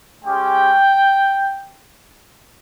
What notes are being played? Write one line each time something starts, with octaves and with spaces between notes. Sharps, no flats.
G#3 C#4 G4 G5